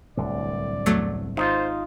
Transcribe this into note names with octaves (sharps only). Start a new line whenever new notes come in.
D1 C2 D3 D5
E2 F#3 A3
G#1 D#4 F4 C5